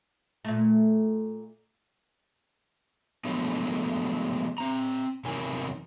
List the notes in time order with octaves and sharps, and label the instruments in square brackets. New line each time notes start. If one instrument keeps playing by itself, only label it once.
[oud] A#2 A3
[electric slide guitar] D3 F3 F#3 G#3 A3 B3
C4 A#5
E2 C3 F#3 D#4 A#4 G#5